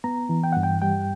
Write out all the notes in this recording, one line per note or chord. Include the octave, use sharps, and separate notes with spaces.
B3 A#5
E3
G5
G2 F#5
G5
G3 G5